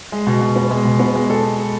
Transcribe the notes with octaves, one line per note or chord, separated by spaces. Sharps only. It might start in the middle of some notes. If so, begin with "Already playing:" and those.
G#3
B2
B2
B3
G#3
B2
B3
G#3
A4